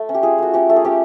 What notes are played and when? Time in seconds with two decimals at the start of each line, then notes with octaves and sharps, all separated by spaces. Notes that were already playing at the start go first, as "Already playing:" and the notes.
Already playing: A3
0.09 C#4
0.14 G4
0.23 F4 G#4
0.38 A3 F#4
0.54 C#4 G4
0.69 A3
0.76 G#4
0.85 C#4 G4